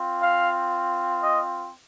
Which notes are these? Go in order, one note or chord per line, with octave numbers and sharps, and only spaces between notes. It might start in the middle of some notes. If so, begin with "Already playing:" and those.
Already playing: C4 F4
F5
D#5